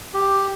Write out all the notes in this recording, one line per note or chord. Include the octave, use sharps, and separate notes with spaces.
G4